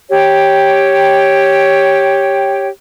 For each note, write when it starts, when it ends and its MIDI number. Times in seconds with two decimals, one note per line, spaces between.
0.09 2.68 67
0.09 2.68 73
0.09 2.68 79